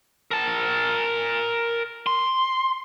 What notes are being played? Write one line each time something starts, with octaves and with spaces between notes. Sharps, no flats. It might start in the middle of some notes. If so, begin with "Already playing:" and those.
A#4 A5
C6